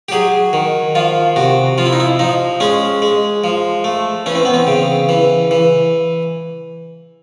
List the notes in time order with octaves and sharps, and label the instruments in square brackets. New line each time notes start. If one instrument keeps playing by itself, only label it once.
[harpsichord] G4
F#3 G#4
D#3
F3 F4
C3 F#4
F3 F4
E4
D#4
E4
F3 D#4
G#3 C#4
G#3
F3
A3
E3 C#4
C4
B3
C4
C#3
E3
E3